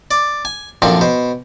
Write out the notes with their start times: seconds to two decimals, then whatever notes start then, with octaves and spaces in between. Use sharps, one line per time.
0.11 D5
0.45 G#5
0.82 F#2 A#2 D3 F3 C4
1.01 B2 C5